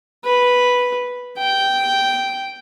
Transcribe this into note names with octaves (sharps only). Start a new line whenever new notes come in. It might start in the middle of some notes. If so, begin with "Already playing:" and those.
B4
G5